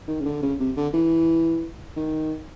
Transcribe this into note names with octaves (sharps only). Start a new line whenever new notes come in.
D#3
C#3
D3
C#3
C3
D3
E3
D#3